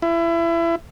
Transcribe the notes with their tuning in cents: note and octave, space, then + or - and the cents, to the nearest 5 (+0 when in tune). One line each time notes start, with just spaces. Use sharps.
E4 +30